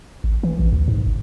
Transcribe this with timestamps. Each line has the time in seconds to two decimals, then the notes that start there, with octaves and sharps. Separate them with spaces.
0.24 G#1
0.43 E3
0.59 A#1
0.72 D2
0.88 G#2
1.07 G1